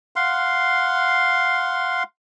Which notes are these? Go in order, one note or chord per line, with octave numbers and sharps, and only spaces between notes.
F5 F#5 C6